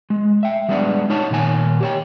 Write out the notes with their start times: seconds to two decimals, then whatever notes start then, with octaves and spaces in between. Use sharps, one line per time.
0.10 G#3
0.43 E5 G5
0.69 G3 G#3 B3 D4 D5 F#5
1.10 D#4 C#5 F#5 A5
1.30 A#2 D#3 F#5 G#5
1.81 G4 C#5 G5